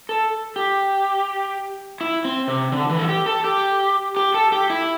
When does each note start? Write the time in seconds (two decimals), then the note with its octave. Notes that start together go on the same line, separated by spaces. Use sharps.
0.09 A4
0.56 G4
2.01 E4
2.25 C4
2.48 C3
2.72 D3
2.90 E3
2.99 A4
3.09 G4
3.26 A4
3.44 G4
4.17 G4
4.34 A4
4.52 G4
4.70 E4